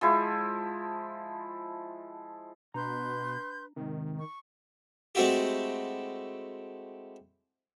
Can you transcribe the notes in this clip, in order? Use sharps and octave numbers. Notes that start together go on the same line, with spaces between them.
F3 G#3 E4
B2 D4 B4 A#5 C6 G6
G#2 C3 D#3
C#6
G#3 A3 C4 E4 F#4 G4